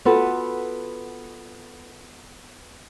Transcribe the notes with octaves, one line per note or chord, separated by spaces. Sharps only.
B3 F4 F#4 A4 B4